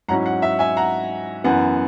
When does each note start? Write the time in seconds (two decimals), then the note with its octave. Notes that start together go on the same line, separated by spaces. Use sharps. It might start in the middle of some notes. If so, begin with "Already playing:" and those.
0.08 G#2 F#3 C#4 E4 F#5 A#5
0.26 F#5
0.42 E5
0.59 E5 G#5
0.77 F#5 A#5
1.44 F#2 E3 B3 F#5